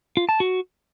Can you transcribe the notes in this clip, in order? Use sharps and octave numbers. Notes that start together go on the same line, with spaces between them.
F4
A5
F#4